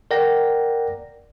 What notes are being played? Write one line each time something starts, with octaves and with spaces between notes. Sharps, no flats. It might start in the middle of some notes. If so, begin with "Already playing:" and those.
A#4 D5 F#5 G5 A#6